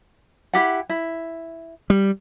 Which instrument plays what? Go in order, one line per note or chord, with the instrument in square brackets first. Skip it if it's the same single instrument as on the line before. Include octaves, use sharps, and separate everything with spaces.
[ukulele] E4 G4 F#5
E4
[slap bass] G3